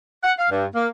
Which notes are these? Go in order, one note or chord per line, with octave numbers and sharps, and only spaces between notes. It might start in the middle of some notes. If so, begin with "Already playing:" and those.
F#5
F5
G2
A#3